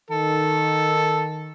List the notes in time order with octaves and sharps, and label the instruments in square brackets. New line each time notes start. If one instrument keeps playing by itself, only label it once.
[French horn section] D#3 [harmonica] A4